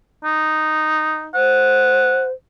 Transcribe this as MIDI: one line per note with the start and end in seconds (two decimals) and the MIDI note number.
0.25 1.30 63
1.35 2.32 72
1.35 2.25 78